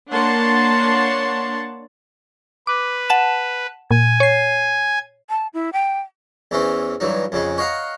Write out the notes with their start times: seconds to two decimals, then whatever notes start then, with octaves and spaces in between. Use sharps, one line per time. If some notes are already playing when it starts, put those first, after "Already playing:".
0.11 A#3 D4 C#5 F#5 A5 C6
2.67 B4 D6
3.10 F#5 A5 E7
3.91 A#2 G#5
4.20 C#5 C7
5.29 A5
5.54 E4
5.73 G5
6.51 E2 E3 C4 C#4
7.00 G2 E3 F#3 D#4
7.32 F2 C#3 G#3
7.58 C#5 D#5 F5 F#5 A#5